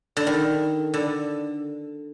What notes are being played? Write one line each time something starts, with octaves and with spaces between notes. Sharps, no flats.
D3
D#3
D3